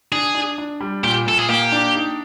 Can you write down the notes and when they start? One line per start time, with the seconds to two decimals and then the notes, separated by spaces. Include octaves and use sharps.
0.12 D4 G#4
0.35 D4
0.58 D4
0.80 G3
1.03 A#2 G4
1.26 A#2 A4
1.39 G#4
1.49 A#3 G4
1.72 D4
1.94 D#4